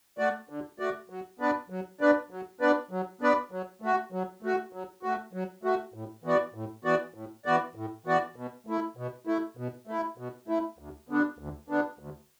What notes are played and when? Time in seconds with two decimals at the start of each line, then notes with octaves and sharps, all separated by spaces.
0.18 A3 F#4 D5
0.49 D3
0.79 A3 F#4 D5
1.10 F#3
1.40 B3 D4 B4 D5
1.70 F#3
2.00 B3 D4 B4 D5
2.31 F#3
2.61 B3 D4 B4 D5
2.91 F#3
3.21 B3 D4 B4 D5
3.52 F#3
3.82 A3 F#4
4.12 F#3
4.43 A3 F#4
4.73 F#3
5.03 A3 F#4
5.33 F#3
5.63 A3 F#4
5.94 A2
6.24 E3 B3 F#4 D5
6.54 A2
6.84 E3 B3 F#4 D5
7.14 A2
7.45 E3 B3 F#4 D5
7.75 A2
8.06 E3 B3 F#4 D5
8.36 B2
8.67 A3 E4
8.97 B2
9.27 A3 E4
9.57 B2
9.87 A3 E4
10.18 B2
10.48 A3 E4
10.79 D2
11.08 D3 B3 D4
11.39 D2
11.68 D3 B3 D4
11.99 D2